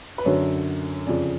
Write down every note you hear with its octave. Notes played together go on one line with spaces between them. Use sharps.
B4
F#2 D3 C#5
F2 C#3 D5